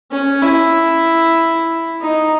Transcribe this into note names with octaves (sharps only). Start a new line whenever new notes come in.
C#4
E4
D#4